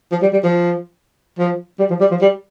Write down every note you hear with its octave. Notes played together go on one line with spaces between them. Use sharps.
F3
G3
G3
F3
F3
G3
F3
G3
F3
G3